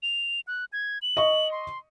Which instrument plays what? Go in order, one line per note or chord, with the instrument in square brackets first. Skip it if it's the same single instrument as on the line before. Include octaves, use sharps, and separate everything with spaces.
[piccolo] F7
F#6
G#6
F#7
[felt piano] D#5 C#6
[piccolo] C6